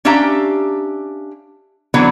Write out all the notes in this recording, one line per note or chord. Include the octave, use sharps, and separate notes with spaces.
C#4 D4 G4 E5 F5 A#5
D3 E3 F#3 B3 C4 D4